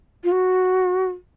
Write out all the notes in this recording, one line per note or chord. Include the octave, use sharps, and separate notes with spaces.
F4
F#4